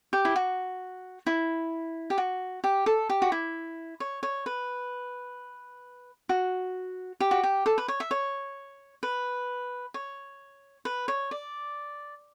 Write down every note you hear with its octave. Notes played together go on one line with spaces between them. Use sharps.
G4
E4
F#4
E4
G4
F#4
G4
A4
G4
F#4
E4
C#5
C#5
B4
F#4
G4
F#4
G4
A4
B4
C#5
E5
C#5
B4
C#5
B4
C#5
D5